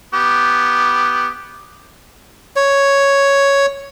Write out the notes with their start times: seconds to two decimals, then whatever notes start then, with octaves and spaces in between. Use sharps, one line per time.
0.14 B3 G4
2.56 C#5